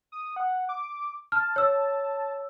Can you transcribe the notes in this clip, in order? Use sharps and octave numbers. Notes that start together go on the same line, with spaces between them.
D#6
F#5
D6
A5 F6
C#5 E6